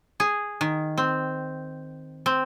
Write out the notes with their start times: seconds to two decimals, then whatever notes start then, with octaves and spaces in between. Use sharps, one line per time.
0.20 G#4
0.61 D#3
0.98 C4
2.26 C4